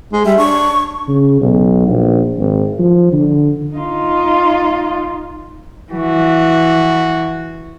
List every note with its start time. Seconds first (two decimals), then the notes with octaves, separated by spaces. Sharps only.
0.13 G#3
0.25 G3 E5
0.38 D4 C#6
1.08 C#3
1.41 B1
1.87 A#1
2.38 G#1
2.79 F3
3.12 D3
3.75 D#4 F4
5.93 E3 F#4